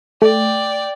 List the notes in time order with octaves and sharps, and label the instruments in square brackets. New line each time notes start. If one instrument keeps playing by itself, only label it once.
[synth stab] A3 [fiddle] D5 G5